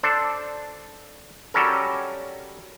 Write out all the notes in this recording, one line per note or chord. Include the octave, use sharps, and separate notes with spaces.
D4 A4 C5 D5
F#3 G3 C#4 A4 A#4